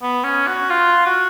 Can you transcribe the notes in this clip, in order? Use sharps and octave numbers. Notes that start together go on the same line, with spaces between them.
B3
C#4
F#4
F4
F#4